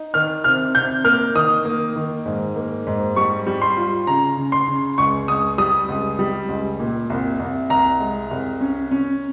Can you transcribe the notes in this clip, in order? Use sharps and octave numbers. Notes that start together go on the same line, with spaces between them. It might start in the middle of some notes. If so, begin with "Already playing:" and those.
Already playing: D#4
D#3 F6
C3 F6
C3 G6
A#3 F6
D#3 D#6
A#3
D#3
G#2
A#3
G#2
G3 C#6
G3
C6
F4
C#3 A#5
C#3
C6
C#3
C#2 C#6
C#2 D#6
G3 D#6
C#2
G3
C#2
A#2
C2
C2
C2 A#5
G#3
C2
C#4
C#4